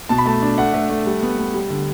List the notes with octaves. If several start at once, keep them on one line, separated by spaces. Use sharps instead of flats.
B2 A5
B5
A3 A5
D4
A3 F#5
A3
A3
G3
B3
B3
G3
D3